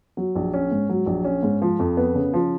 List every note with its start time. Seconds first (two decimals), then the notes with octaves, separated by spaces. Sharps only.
0.17 F#3
0.35 A#1
0.54 C#4
0.71 G#2
0.89 F#3
1.06 A#1
1.25 C#4
1.43 G#2
1.62 F3
1.79 F2
1.97 B3
2.15 C#3
2.34 F3